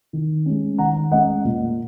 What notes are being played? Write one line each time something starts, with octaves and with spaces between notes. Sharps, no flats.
D#3
G#3 C#4
D#3 F#5 A#5
G#3 C#4 D#5 F#5
A#2